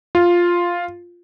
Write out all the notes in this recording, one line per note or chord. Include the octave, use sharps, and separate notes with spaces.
F4